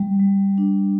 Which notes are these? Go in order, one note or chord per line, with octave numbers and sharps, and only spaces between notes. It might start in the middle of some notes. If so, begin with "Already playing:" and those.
Already playing: G3
G3
D4